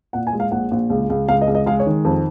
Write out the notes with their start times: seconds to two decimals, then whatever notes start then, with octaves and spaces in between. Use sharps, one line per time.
0.13 A#2 F#5
0.27 G#5
0.33 G#3
0.40 F5
0.51 A#1 F#5
0.71 A#1
0.90 C#2
1.10 C#2
1.29 C#2 F5
1.41 D#5
1.47 C#2
1.55 D#5
1.66 G#3 F5
1.80 C#5
1.87 D#3
2.05 F2